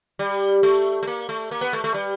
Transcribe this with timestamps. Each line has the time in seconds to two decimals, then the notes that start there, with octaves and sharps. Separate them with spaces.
0.19 G3
0.63 A3
1.03 A3
1.07 A#3
1.29 A3
1.51 A#3
1.61 B3
1.73 A3
1.84 A3
1.94 G3